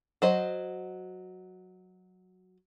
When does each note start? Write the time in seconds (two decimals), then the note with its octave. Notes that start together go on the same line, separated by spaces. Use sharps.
0.22 F#3 C5 D#5